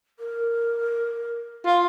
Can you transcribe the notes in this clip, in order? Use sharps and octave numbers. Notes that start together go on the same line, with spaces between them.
A#4
F4